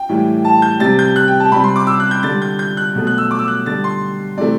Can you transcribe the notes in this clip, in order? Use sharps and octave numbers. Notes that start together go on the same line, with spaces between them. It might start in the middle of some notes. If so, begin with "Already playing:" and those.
Already playing: G5
A2 E3 G3
A5
G6
C3 G3 A6
G6
F#6
G5
A5
C3 G3 B5
C6
D6
E6
F#6
G6
D3 G3 A6
G6
G6
F#6
B2 F#3 A3
F#6
E6
D6
E6
F#6
D3 G3 A6
C6
C3 E3 A3 D5